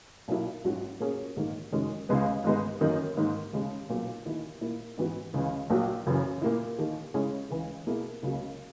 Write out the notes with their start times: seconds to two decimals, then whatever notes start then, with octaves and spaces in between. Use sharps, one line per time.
0.28 B1 A#2 F#3 A#3 E4
0.64 A#1 G#2 F#3 C#4 F#4
1.00 A#2 A#3 C#4 G#4 C#5
1.36 A#1 G#2 D#3 A#3
1.72 F#1 F#2 D#3 G#3 C#4
2.09 C#2 C#3 G#3 B3
2.44 G#2 D#3 G#3 B3 D#4
2.81 F#2 D#3 A#3 D#4
3.17 G#2 D#3 A#3
3.53 D#2 C#3 G#3
3.89 B1 A#2 F#3 B3
4.25 D#2 D#3 A#3 E4
4.61 A#2 A#3 E4
4.97 G#2 E3 B3 F#4
5.34 C#2 C#3 E3
5.70 A#1 A#2 F#3
6.06 F#1 F#2 C#3 E3
6.42 A#2 A#3 E4
6.78 D#2 D#3 A#3
7.14 C#3 G#3 C#4 E4 G#4
7.50 C#2 C#3 E3
7.87 B2 A#3 E4 G#4
8.23 C#2 C#3 F#3 A#3